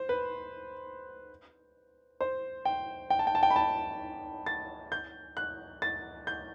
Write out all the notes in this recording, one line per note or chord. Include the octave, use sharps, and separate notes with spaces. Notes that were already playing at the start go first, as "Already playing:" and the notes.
Already playing: C5
B4
C5
G5
G5
A5
G5
A5
G5
B5
A5
A6
G6
F#6
A6
G6